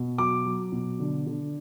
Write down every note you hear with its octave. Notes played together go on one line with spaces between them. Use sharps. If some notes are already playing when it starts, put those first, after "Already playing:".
Already playing: B2
F#3 D6
F#3
B2
D3
D3